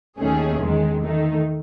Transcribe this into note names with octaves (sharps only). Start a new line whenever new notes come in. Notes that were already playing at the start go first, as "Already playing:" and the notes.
D#2 D#3 A3 C#4 G#4
E2 D#3 G#3
D#3 A3 D#4